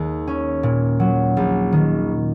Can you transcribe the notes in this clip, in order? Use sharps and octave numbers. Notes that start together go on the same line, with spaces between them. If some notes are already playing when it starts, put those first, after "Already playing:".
Already playing: D#2 G#3
C#4
A#2
F#3
A#1
D#3